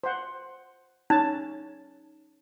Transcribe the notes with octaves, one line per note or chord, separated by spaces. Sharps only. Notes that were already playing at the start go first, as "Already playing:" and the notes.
C5 F#5
C#4 D#4 A5